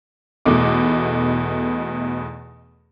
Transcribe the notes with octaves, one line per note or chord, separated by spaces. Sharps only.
E2 B2 A3 D#4 D6